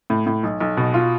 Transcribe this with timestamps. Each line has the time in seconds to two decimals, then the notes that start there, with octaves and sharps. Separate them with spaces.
0.10 A2
0.26 A2
0.43 B1
0.61 B1
0.77 B2
0.94 F4